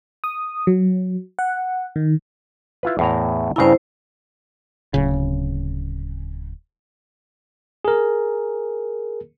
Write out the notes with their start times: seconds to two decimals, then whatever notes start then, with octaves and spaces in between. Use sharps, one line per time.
0.24 D#6
0.67 F#3
1.39 F#5
1.96 D#3
2.83 E4 F4 B4
2.99 E2 A2 A#5
3.56 G2 C#3 E4 C5 A#5
4.94 D1 C#3
7.85 G#4 A#4